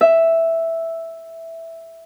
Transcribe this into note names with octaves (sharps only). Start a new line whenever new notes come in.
E5